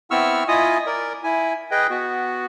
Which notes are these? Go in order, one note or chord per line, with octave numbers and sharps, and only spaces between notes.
B3 C4 E4 C#6 E6 F6
E4 F4 D#5 G#5 D#6
A#4 D5
E4 G#5
G#4 B4 D#5 G5
B3 F#4